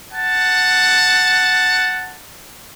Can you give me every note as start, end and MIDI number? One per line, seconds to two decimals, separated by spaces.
0.12 2.16 78
0.12 2.16 81